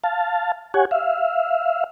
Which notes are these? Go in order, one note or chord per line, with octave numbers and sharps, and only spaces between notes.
F5 A5
G4 C#5 F#5 G#5
E5 F5